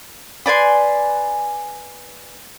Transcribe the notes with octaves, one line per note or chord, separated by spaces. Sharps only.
B4 D5 G#5 C6